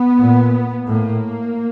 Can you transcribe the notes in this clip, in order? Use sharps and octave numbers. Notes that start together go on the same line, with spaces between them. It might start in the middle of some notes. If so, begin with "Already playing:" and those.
Already playing: B3
A#2
A2 A#3